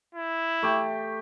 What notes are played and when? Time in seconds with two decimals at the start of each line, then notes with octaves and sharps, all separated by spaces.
0.15 E4
0.63 A3 G4